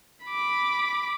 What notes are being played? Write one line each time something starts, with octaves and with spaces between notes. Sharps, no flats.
B5 D6